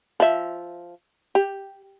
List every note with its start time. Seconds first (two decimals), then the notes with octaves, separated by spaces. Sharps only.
0.20 F3 E5
1.35 G4